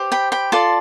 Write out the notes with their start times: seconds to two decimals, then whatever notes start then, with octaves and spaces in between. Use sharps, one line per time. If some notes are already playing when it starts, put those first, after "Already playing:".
Already playing: G4 C5
0.12 G5 B5
0.32 G5 B5
0.52 F4 A4 D5 A5 C6